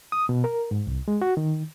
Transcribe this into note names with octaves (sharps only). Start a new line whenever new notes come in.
D#6
B2
A#4
G#2
C2
G#3
F#4
D#3